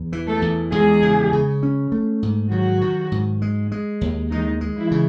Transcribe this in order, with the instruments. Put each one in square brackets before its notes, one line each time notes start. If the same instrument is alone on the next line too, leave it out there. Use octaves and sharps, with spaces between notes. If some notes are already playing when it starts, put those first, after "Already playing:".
Already playing: [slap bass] E2
E3
[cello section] A3 A4
[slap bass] E2
[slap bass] E2 [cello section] G#3 G#4
[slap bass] C#3
C#3
C#4
A3
G#2
[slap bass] D#3 [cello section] F#3 F#4
[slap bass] D#3
G#2
G#3
G#3
D#2
[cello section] D#3 D#4 [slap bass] G#3
[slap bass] G#3
[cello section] E3 E4
[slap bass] C#3